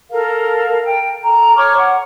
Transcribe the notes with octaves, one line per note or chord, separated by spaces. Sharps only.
A4 A#4 F5
G5
A4 A#5
C#5 C#6 D6 F6
F#5